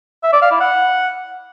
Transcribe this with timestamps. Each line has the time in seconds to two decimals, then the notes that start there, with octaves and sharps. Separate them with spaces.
0.23 E5
0.33 D5
0.42 F5
0.51 E4
0.60 F#5